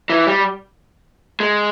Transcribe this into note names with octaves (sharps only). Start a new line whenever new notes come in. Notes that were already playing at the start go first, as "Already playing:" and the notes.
E3
G3
G#3